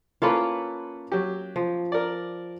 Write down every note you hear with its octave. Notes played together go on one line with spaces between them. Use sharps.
A#3 C#4 E4 F4 A4 B4
F#3 G4
F3
A#4 D5